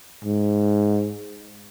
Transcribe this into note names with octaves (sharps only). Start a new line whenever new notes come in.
G#2